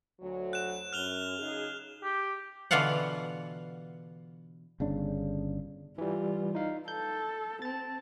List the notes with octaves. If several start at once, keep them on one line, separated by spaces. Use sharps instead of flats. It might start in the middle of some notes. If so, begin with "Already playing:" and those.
D2 F#3
F#6 E7
F#2 F6 F7 G7
C#3 D#4 G#4
G4
B2 D3 E3 F4 F5 F#5
G1 C#3 D4
E3 G3 F4
D#4 F5
A4 G6
C4 A5 A6